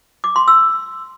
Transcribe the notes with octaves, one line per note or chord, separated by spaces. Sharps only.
D6
C6
E6